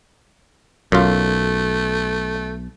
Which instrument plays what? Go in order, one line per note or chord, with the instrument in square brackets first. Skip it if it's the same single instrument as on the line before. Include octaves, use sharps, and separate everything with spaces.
[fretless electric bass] B1 [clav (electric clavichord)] F#2 F4 [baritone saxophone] A3